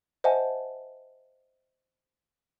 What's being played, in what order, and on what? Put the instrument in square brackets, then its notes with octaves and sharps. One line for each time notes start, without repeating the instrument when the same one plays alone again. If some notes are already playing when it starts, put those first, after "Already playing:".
[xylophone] C5 D#5 E5 F#5 G#5 A5